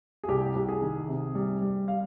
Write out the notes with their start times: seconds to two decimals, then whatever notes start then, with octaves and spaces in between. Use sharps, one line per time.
0.24 G#4
0.28 C2 G4
0.56 C2
0.69 G#4
0.82 D#3
1.08 C3
1.35 G3
1.61 G3
1.88 F5